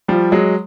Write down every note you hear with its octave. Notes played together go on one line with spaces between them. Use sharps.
F3 G3
F#3 G#3